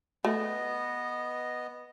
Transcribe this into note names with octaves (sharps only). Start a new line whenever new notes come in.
A3 B3 D#5